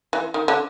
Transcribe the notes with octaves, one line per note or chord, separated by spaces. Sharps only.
E3
D#3
D3